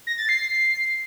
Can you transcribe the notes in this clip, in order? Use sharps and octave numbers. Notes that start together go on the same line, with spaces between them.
A#6
A6
C7